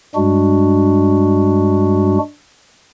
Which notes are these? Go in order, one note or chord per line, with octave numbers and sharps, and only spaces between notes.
G2 G3 G#3 D4 F#4